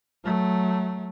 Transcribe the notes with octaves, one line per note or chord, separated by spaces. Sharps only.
F#3 A3